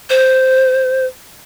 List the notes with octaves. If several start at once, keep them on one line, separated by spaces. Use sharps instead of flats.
C5